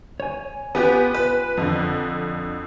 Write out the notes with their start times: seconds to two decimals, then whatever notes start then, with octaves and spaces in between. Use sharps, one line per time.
0.20 C#5 G#5
0.75 B3 F4 G4 B4 G#5
1.14 B4
1.57 F2 D3